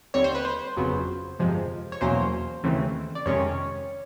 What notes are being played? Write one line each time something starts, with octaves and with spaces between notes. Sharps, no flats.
D#2 D3 G3 C4 C#5
C5
B4
C5
G1 F2 C#3 F#3 B3
G1 F2 C3 F3 G#3
C#5
E2 B2 F#3 A#3 C#4 C5
D#2 C#3 E3 A3 C4
D5
F2 C3 D#3 G#3 C#4 C#5